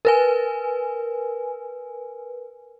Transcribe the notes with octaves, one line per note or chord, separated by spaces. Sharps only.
A#4 B4 G#5